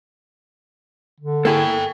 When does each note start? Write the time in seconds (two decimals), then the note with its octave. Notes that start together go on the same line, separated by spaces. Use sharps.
1.20 D3
1.45 A#3 E4 G#4 A4 G5